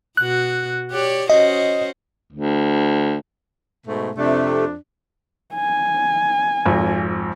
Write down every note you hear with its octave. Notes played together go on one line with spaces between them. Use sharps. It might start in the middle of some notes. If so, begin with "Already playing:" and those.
B2 F#4 F#6
G4 C#5 D5
C#4 F#4 C5 D#5
D2
G#2 B2 A3
F2 C3 A3 D4
G#5
G#1 F2